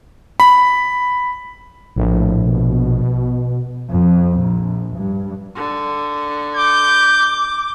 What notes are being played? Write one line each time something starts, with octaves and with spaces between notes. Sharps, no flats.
B5
A#1 A2
B2
F2
A#1
G2
D3
D6 G6